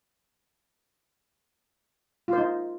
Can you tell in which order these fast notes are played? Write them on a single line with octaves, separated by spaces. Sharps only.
F4 C5 D#4